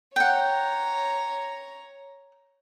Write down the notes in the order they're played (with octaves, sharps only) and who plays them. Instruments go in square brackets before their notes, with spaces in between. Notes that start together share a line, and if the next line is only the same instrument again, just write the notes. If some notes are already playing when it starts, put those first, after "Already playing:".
[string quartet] C#5 A#5 [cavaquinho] F#5 G5